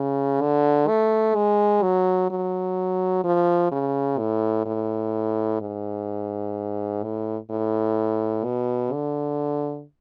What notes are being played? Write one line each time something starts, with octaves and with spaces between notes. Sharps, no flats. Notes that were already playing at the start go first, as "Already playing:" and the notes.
Already playing: C#3
D3
A3
G#3
F#3
F#3
F3
C#3
A2
A2
G#2
A2
A2
B2
D3